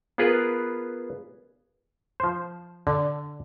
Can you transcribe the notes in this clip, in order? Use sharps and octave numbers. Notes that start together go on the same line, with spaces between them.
B3 F4 G#4 A#4 B4
F3 C5
D3 D5